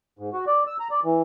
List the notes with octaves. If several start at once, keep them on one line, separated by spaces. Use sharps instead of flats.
G#2
F#4
D5
E6
A#5
D5
E3